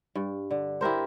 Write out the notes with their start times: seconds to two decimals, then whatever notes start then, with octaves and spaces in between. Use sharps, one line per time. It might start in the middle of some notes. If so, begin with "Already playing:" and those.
0.15 G2
0.51 D3
0.81 E4 G4 A#4 C5